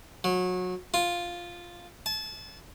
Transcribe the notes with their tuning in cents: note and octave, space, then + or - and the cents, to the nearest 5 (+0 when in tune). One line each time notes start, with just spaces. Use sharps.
F#3 -25
F4 +0
A5 -30